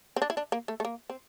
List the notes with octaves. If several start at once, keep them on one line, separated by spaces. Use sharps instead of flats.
C4
D4
E4
D4
A#3
A3
A3
A#3
C4